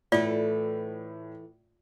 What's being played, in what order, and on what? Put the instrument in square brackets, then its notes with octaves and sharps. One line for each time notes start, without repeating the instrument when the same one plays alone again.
[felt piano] A2 [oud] E3 A3 [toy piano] F4 D5